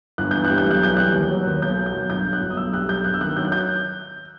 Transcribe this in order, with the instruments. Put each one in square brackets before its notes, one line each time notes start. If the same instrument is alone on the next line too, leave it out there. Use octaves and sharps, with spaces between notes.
[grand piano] G1 F#6
E3 G6
F#6
G3
G6
B1 F#6
E3 G6
G3 F#6
D#2
F#3
D#2
B1 G6
F#3
G6
B1
G1 G6
F#3
F#6
G1
D#6
B1 E6
G3 F#6
B1 G6
G1 F#6
E6
D#3 F#6
F#3 G6
F#6
G6